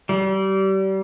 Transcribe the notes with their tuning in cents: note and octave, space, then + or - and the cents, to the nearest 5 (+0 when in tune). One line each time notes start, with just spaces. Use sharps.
G3 -30